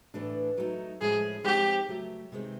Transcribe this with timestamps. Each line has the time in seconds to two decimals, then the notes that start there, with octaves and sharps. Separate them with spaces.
0.14 A2 E3 A3 D4
0.57 F#3 A3 C4 D#4
1.01 A2 F3 G#3 C#4 E4 G#4
1.44 F3 G#3 C4 D#4 G4
1.88 C#3 F#3 A3
2.32 C3 D#3 G#3 C4